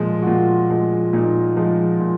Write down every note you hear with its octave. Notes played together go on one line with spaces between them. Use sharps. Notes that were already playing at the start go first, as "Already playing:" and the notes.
Already playing: A#2 F3 G#3
F#4
A#2 F4
F3 G#3
A#2 D#4
F3 G#3
A#2